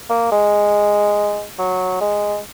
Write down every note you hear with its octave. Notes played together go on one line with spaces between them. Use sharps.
A#3
G#3
F#3
G#3